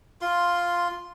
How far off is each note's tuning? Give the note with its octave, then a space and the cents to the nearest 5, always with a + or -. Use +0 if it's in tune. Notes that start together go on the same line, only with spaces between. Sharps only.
F4 +0 C6 +0